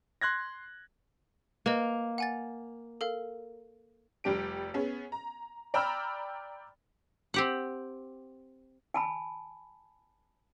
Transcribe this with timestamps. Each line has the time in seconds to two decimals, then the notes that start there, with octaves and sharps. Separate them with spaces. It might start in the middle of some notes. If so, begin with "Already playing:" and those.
0.21 C6 F#6 G#6 A#6
1.66 A#3 B4 D#5
2.18 F#5 G#5 A6
3.01 A4 A#4 F5
4.24 F1 G3 G4 D7
4.74 B3 C#4 G#4
5.12 A#5
5.74 D5 G5 A#5 B5 E6 F6
7.34 C4 G4 F#5
8.94 G#5 A5 B5